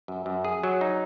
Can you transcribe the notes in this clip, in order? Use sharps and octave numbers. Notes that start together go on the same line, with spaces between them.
F#2
F#2
G#4
F#3
D#4